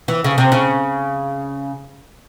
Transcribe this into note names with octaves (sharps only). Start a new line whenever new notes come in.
E3
C#3
C3
C#3